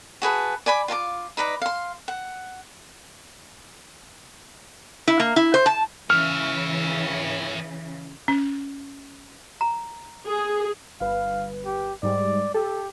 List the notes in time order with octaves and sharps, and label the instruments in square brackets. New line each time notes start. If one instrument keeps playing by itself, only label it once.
[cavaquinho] F#4 G#4 B4 A5
D5 G#5 B5 D6
F4 F5 A5 D6
D#4 B4 D5 A#5
F5 C6
F#5
[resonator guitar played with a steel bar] E4
A#3
E4
C5
A5
[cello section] C#3 E3 [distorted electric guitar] C#5 E5 [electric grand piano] F6
[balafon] C#4
[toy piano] A#5
[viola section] G#4
[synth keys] G1 B4 [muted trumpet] F5
[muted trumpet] G4
[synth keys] G#2 G3 G#3 [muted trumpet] D5
[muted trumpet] G4 [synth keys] A4